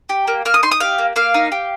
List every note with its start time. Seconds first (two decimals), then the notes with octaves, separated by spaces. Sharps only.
0.09 G4
0.28 A#3
0.45 A#3 F6
0.54 D#6
0.63 D#4 C6
0.71 D#6
0.80 G4 F5
0.98 A#3
1.16 A#3 F5
1.34 D#4
1.52 G4